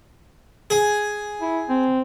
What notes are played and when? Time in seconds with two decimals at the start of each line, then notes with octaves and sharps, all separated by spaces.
0.70 G#4
1.41 E4
1.69 C4